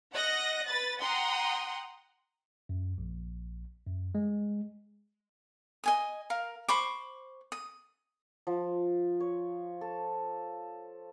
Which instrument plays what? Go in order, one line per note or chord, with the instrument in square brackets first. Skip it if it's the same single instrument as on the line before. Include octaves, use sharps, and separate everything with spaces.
[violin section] D#5 F#5 F#6 A#6
B4 B5 A6
F#5 G5 A#5 C6 D#6
[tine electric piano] F#2
A#1
F#2
G#3
[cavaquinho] D#5 G#5 D#6
A#4 F5
C5 B5 C#6 D6
D#6
[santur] F3
C#5
A4